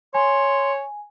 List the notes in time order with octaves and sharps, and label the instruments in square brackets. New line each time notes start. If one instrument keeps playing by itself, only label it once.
[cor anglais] C#5 [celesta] G#5 [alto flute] C6